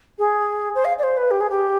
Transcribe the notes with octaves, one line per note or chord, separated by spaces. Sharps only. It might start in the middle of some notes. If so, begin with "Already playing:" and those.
G#4
C5
F5
D5
C5
B4
G4
G#4
G4